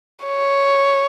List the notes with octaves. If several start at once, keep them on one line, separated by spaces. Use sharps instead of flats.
C#5